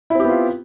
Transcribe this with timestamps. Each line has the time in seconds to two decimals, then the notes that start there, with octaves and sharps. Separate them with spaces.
0.10 E4
0.15 C4
0.20 G4
0.24 B3
0.29 F4